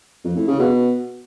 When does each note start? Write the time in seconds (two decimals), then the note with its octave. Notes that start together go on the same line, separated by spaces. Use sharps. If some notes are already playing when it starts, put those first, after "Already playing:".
0.24 F2
0.36 A2
0.48 C#3
0.59 B2